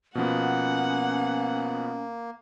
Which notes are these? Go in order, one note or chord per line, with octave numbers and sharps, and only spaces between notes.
B2 F3 A#3 B3 C#4 F#5